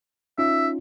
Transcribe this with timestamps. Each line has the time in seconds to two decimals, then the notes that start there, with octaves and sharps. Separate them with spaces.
0.38 C#4 D#4 F4 E5